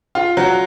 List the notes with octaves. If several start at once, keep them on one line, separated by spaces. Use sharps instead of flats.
F4
F#3